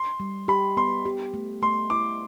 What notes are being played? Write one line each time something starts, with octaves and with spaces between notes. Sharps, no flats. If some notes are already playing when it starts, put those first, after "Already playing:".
Already playing: C6
G3
G4 B5
B3 C6
G4
A3
A3 C6
E4 D6